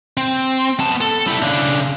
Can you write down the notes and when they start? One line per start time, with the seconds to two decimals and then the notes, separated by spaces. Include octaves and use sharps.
0.17 C4
0.80 B3 A5
1.01 A4
1.27 G3 E4
1.42 C#3 D4